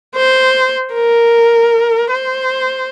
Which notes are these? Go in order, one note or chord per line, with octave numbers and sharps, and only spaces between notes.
C5
A#4
C5